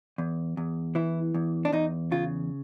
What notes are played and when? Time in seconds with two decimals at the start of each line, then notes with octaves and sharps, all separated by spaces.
0.18 E2
0.57 E2
0.95 E3 E4
1.34 E2
1.65 D4
1.72 E2 D#4
2.11 C#3 F4